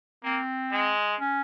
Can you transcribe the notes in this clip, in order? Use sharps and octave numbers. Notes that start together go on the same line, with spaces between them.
A#3 C4
G#3
C#4